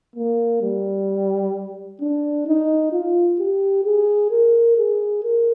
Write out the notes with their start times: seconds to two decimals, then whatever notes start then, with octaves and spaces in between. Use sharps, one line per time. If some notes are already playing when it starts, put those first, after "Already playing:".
0.16 A#3
0.62 G3
2.01 D4
2.47 D#4
2.92 F4
3.39 G4
3.84 G#4
4.31 A#4
4.77 G#4
5.24 A#4